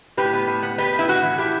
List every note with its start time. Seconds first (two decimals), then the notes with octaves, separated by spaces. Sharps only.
0.17 A2 G4 B4
0.33 B3
0.47 A2
0.63 B3
0.78 B3 G4 B4
0.93 A2
0.99 E4
1.08 A2 F#4
1.23 E3
1.38 A2 E4 G4